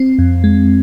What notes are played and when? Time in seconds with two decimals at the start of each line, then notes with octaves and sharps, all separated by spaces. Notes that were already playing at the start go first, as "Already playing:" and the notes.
Already playing: C4
0.19 F2
0.44 G#3